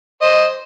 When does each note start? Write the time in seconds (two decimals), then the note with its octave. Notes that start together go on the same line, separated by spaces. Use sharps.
0.22 C5 D#5